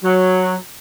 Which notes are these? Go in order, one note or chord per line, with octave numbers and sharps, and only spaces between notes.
F#3